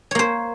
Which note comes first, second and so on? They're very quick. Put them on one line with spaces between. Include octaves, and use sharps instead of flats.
C#5 A#3 C5